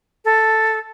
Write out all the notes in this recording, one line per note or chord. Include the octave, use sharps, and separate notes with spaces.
A4